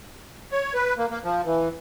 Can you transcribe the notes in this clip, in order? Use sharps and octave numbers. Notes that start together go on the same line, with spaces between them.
C#5
B4
A#3
A#3
F3
E3